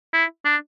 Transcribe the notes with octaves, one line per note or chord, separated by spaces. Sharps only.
E4
D4